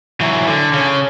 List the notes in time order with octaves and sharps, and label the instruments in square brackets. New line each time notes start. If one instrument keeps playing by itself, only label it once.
[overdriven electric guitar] E3 F#3
D3
C#3 C#4